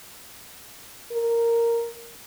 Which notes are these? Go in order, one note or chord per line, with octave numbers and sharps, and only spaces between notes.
A#4